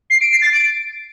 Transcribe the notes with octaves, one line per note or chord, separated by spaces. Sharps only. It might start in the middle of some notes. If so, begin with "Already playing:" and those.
C7
D7
C7
A6
D7